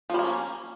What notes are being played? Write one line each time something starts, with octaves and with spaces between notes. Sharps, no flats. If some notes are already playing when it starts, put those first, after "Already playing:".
F3 G3 A#3 C#4